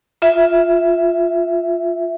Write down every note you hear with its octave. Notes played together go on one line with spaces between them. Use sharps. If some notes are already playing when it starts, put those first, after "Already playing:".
F4 E5